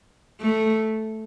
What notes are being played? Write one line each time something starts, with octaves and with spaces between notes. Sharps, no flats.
A3